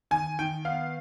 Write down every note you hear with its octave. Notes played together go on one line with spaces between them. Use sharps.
D#3 G#5
D#3 G5
B3 F5